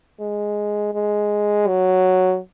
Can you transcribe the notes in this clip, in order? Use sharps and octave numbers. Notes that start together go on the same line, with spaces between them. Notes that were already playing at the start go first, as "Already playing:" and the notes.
G#3
G#3
F#3